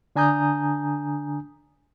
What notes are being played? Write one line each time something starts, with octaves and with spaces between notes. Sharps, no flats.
D3 D4 G#5 A#5 D#6 G6